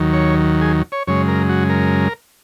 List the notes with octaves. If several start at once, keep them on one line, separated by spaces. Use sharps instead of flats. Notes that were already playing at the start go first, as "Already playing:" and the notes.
Already playing: D#2 D#3 F#3
C#5
G#4
C#5
F#2 C#3 G#3 C#5
A#4
F#4
A#4